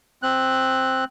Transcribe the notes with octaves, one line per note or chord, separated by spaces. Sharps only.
C4 F#6